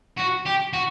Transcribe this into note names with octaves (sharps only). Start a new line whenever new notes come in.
F#4
G4
F#4